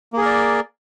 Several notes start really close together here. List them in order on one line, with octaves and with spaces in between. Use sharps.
A#3 G#4 A#4 D5